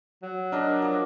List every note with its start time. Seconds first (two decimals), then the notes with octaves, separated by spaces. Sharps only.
0.22 F#3
0.52 D4 A#4 D5 D#5 A5
0.82 F3 D6